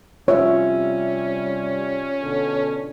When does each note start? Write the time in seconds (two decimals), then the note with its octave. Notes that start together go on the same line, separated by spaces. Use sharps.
0.28 C3 G3 C#4 F4 C#5 E5 F5
2.22 B2 D3 A4